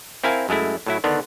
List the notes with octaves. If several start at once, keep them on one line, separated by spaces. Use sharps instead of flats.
C4 E4 A#4 F5 G#5
F#2 G#3 A3 E4
A2 F#3 E4
D3 D#3 B3 D4